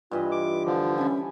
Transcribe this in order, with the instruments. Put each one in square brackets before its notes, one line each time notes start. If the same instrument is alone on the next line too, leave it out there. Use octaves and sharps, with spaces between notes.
[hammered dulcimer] G2 E3 D#5 [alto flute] F4
[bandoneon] D6
D3 F3
[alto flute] C#4 [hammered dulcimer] E4 A4 G#5